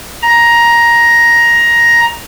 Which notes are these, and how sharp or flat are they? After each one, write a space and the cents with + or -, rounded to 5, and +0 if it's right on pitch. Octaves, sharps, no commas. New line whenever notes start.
A#5 +10